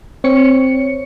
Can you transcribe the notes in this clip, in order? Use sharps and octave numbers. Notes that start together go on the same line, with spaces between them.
C4 C#5 C#7